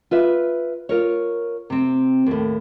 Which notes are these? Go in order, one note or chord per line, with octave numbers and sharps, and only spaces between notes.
F4 B4 E5
F4 A#4 C#5
C3 C4
D#2 A2